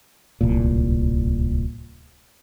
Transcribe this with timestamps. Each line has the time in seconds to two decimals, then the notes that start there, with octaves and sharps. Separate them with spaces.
0.41 D1 C2 A#2